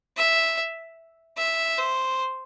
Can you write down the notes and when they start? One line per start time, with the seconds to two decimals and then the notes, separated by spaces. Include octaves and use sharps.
0.17 E5
1.38 E5
1.78 C5